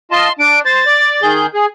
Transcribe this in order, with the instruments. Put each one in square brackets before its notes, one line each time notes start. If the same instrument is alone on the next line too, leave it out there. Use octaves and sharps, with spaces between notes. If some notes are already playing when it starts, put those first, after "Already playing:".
[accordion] F4 D#5 A5 [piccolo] C6
[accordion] D4 [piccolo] D7
[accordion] C5 [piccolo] A6
[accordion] D5
D#3 G#4 G6
G#4